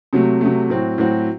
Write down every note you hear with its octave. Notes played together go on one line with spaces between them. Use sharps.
C3 F#3 A3
C3 F#3 A3
A2 F#3 C4 F#4
A2 F#3 C4 F#4